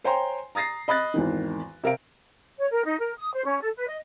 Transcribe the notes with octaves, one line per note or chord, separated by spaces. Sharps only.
C5 C#5 G5 G#5 A#5 C6
A#5 D#6 A6 A#6 C7
D#5 B5 D#6 F#6 A6 A#6
G#1 E2 D#3
C3 A#4 F5 D7
C#5
A#4
D#4
A#4
D#6
C5
C#4
A4
B4
D#5